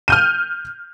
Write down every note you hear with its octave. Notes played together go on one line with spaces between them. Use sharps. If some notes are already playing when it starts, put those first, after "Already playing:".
F6 G6 D#7